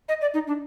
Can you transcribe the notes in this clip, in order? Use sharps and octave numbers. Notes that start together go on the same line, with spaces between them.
D#5
D5
D#4
D4